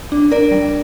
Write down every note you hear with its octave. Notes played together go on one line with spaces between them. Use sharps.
D4
D4 A#4 D5
G3